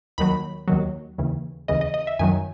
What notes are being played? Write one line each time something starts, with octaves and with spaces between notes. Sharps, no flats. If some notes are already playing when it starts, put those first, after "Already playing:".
D#2 D#3 F#3 B5
D#2 D#3 F#3
D#2 C#3 E3
D#2 C#3 E3 D#5
D#5
D#5
E5
F#2 D#3 F#3 G#5